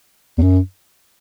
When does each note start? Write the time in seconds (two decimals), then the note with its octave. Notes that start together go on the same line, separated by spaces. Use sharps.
0.38 E2
0.42 F#2